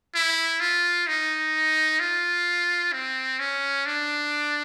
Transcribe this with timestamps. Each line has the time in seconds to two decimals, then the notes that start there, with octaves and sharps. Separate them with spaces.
0.15 E4
0.60 F4
1.07 D#4
2.00 F4
2.93 C4
3.39 C#4
3.86 D4